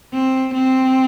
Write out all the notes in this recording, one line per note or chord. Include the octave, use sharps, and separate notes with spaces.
C4
C4